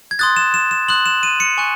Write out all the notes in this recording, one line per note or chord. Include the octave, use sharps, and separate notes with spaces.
G#6
C6 D#6 F#6 A6
E7
E7
E7
C6 D#6 F#6 F#7
E7
D#7
C#7
G#5 C#6 F#6